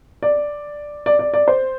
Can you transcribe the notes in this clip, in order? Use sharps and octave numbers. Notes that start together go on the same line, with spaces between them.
D5
D5
D5
D5
C5